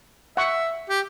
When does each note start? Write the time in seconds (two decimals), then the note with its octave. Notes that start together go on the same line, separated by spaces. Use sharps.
0.37 E5 F#5 C#6
0.89 G4